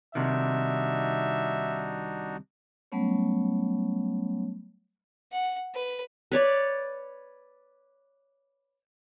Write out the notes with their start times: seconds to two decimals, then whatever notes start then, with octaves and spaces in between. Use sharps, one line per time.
0.15 C2 C3 D#3 D4 D#4 F#4 E5
2.92 F#3 G3 A3 B3 C#4 C#5
5.32 F#5
5.74 B4
6.32 B4 C#5 D5